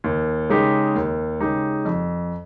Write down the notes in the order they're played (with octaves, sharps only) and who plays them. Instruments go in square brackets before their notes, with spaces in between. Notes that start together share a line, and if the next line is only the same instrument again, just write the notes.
[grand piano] D#2
C#3 G#3 D#4 G4
D#2
C#3 G#3 D#4 G4
F2